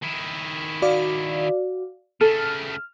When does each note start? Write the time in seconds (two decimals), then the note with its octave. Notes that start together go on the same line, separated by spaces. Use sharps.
0.02 D#3 E4
0.82 F#4 D5 F5
2.21 C#3 A3 A4 F6